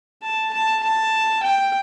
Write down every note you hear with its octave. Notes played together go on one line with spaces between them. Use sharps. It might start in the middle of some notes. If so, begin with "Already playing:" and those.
A5
A5
A5
G5